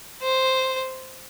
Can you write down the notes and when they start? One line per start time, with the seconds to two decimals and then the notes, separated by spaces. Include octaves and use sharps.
0.22 C5